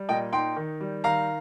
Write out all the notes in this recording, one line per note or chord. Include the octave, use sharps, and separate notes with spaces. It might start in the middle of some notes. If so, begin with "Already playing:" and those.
Already playing: G3
A#2 D#5 G5
D#4 G5 C6
D#3
G3
D#3 F5 A#5